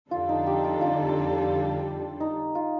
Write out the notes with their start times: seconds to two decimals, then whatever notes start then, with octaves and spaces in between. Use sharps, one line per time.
0.11 F2 D3 G3 D4 F4 A4
0.29 D#4
0.47 G4
0.64 F4
0.81 F4
2.20 D#4
2.55 F4